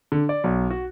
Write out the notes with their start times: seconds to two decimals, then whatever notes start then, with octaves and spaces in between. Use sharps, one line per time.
0.12 D3
0.29 D5
0.44 B1
0.70 F#4